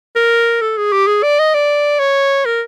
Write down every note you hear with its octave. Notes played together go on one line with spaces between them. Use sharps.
A#4
A4
G#4
G4
G#4
D5
D#5
D5
C#5
A#4